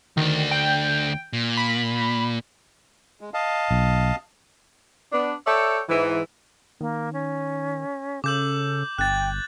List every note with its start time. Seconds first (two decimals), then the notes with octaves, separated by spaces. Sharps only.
0.17 D2 D#3 D4
0.51 G5
1.33 A#2
1.57 B5
3.21 G#3
3.34 D#5 F5 A5
3.71 B1
5.13 B3 D4
5.46 A4 C#5 D5 E5 G5
5.89 G#2 E3
6.81 D#3 A#3
7.13 C#4
8.24 C#3 A4 D6 G6 F#7
8.99 G1 G5 F#6 A6